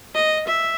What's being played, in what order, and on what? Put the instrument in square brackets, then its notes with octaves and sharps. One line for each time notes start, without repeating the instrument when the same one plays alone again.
[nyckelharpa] D#5
E5